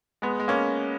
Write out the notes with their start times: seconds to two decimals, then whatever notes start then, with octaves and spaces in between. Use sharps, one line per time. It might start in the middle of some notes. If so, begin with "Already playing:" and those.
0.22 G#3 B3
0.40 G#3
0.48 A#3 C#4